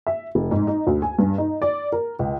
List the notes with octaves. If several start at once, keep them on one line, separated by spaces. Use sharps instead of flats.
E5
F1
G#2
D#4
D2
G#5
G2
D#4
D5
A#4
C#2